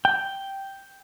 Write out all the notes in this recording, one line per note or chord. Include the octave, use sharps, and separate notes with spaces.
G5